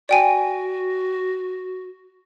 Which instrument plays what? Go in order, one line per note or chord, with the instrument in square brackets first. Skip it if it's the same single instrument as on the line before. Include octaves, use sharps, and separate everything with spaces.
[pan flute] F#4 [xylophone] D5 G5 G#5